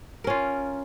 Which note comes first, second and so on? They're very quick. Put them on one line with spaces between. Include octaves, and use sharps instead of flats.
A#4 C#4 F4